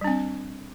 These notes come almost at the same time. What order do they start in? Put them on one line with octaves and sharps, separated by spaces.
G3 D4 C4